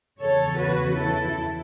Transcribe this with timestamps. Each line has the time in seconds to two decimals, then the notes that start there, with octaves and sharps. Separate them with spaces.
0.21 E2 C#3 E3 A4 C#5
0.60 F#4 B4
0.98 E4 A4